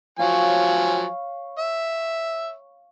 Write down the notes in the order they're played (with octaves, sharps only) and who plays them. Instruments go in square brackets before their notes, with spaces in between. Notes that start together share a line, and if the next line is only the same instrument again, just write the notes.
[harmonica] F3 F#3 G#5 [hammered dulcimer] C#5 F5
[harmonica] E5